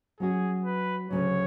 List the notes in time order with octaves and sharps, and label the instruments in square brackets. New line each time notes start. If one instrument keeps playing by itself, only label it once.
[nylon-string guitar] F#3 C#4 F#4 [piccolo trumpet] G#4
[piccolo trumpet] B4
[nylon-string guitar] D2 C#3 F#3 [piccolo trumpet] C#5